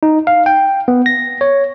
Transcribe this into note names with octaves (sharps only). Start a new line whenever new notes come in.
D#4
F5
G5
B3
A#6
C#5